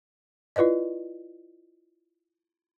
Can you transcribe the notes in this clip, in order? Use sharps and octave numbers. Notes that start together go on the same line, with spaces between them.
E4 F4 B4 D5 D#5